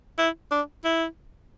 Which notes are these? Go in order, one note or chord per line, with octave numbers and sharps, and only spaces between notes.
E4
D4
E4